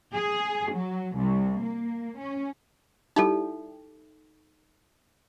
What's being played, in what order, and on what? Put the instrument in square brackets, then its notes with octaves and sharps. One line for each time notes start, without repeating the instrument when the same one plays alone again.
[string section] G#4
F#3
C2
A#3
C#4
[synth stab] G3 E4 G4 [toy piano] D#4 A4